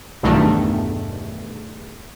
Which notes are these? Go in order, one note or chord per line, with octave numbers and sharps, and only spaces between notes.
B1 E2 G2 D#3 A3